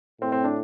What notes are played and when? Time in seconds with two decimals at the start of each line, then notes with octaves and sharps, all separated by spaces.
0.21 A2 C4
0.32 C4
0.44 D4